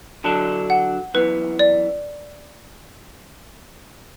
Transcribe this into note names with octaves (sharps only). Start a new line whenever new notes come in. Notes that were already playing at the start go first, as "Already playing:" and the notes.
D3 F#3 D4 A4 A5
F#5
F#2 E3 B3 B4
D5